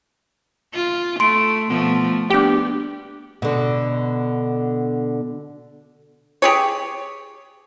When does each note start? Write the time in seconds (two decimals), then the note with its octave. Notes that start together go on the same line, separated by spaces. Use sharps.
0.74 F4
1.20 A3 C6 D7
1.70 B2 F3 A3
2.30 B3 D4 G4 G5
3.42 B2 D3
6.42 G4 G#4 C#5